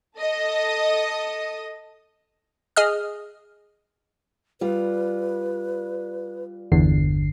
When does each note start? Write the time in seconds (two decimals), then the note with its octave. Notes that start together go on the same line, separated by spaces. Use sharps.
0.18 A4 D#5 D#6
2.76 G#4 D#5 D#6 F6
4.61 G3 F4 B4
6.72 G1 E2 D3 C7